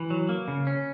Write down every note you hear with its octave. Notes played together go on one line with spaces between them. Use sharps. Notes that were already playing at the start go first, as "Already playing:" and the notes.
Already playing: E3
F#3
A#3
C#3
C#4